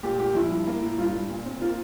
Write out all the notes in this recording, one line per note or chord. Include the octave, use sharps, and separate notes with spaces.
A#2 G4
A#2 G4
F3 E4
G2
A#3
A2
G2 F4
G2
A#2
C4
A#3 F4